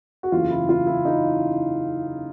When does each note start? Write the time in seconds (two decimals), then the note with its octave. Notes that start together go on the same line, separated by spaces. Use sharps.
0.23 F#4
0.32 F#1 E2 C#3 E3 F4
0.50 E4
0.69 F4
0.87 E4
1.05 D#4